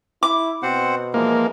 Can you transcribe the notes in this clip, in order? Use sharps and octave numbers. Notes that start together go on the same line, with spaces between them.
E4 D6
B2 C4 C5 F#5
E3 F3 G#3 A#3